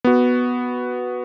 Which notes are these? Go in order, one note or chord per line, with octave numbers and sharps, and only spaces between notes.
B3 F#4